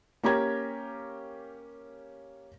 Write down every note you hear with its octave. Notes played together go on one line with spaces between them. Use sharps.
A#3 C#4 G4 A#5 G#6